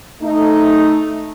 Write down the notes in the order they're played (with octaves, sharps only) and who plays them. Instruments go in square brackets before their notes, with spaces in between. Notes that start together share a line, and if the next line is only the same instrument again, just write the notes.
[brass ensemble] A3 D#4